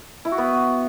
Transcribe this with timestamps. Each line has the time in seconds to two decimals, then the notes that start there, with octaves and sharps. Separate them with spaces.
0.25 E4
0.32 F#4
0.38 B3